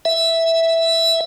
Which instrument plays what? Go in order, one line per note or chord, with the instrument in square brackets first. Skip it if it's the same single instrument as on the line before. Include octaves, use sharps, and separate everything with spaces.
[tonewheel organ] E5